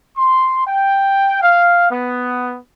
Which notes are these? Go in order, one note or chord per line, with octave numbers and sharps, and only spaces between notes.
C6
G5
F5
B3